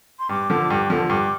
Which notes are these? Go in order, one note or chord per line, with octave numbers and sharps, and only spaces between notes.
C6
G2 D6
D3 F3
G2
D3 F3
G2 D6